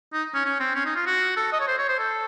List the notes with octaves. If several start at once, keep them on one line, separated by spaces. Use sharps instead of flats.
D#4
C#4
C#4
C4
C#4
D#4
F4
F#4
A4
D#5
C#5
C5
C#5
C5
A4